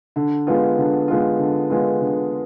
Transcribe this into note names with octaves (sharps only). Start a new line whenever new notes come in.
D3
G#3 B3 F4
D3
G#3 B3 F4
D3
G#3 B3 F4
D3